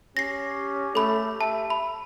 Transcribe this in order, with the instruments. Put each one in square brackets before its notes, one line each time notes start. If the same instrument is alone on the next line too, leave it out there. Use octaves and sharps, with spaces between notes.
[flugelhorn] C#4 [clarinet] G4 [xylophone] A#6 C7
[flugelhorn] A3 [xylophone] A4 B5
[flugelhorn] E5 [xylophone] A5
[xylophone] B5